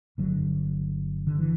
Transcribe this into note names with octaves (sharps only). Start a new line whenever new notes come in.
G1 G2 D3 F#3
D3
E3